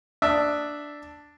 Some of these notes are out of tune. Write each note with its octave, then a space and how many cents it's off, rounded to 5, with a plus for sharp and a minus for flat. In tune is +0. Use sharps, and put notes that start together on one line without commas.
D4 +0 E5 +0 D#6 +0